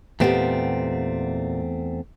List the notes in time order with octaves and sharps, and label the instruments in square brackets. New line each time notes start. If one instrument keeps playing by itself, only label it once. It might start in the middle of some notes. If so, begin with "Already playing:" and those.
[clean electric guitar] E2 A3 C4 [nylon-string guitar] A#2 B3 G4